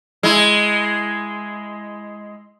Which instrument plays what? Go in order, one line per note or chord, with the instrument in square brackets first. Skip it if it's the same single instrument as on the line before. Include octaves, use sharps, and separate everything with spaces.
[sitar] G#3 E4